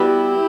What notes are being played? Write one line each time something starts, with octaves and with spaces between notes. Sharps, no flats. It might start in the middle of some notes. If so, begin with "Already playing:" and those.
Already playing: G3 B3 E4 F#4 G4 B4